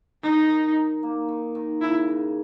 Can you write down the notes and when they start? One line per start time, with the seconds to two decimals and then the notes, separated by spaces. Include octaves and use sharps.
0.23 D#3 D#4
0.50 D#3
0.75 D#4
1.03 A#3
1.29 D#3
1.55 D#3
1.81 C#3 E4
2.08 C#3